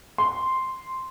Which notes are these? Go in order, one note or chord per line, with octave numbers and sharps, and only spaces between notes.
C6